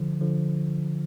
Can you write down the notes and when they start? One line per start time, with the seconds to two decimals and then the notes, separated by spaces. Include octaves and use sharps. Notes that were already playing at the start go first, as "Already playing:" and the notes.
Already playing: D3 F3
0.21 D3 F3